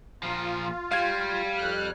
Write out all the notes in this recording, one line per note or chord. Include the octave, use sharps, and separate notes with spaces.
A#2 F3 F4
G3 F5 G#6
F2 F6 F#6